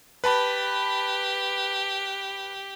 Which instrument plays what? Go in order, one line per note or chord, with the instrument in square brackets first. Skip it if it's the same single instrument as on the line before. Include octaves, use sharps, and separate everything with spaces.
[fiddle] G4 [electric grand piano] B4 A5 B5